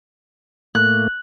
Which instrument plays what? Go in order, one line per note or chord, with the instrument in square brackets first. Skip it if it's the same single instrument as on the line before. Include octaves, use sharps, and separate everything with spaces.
[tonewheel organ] A2 A3 A#3 [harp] F#6